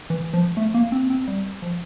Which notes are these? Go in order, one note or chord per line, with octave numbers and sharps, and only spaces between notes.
E3
F3
A3
A#3
C4
C4
G3
F3